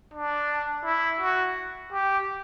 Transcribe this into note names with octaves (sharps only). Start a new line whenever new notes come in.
D4
E4
F#4
G4